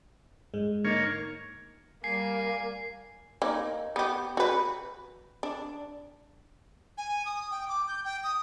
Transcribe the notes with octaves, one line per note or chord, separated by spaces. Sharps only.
G#2 G#3
D3 A#3 D#4 C#5 A6
G3 A#3 G#5 C7
A#3 D#4
B3 G4
F#4 B4
D4
G#5
D#6
G5
D6
G6
G5
D#6